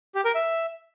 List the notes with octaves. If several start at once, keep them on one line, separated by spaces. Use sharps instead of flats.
G4
A#4
E5